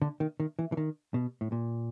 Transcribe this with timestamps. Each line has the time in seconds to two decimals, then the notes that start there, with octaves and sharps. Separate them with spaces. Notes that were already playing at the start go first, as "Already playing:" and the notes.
0.02 D3
0.20 D#3
0.40 D#3
0.59 E3
0.72 E3
0.77 D#3
1.14 B2
1.41 A2
1.52 A#2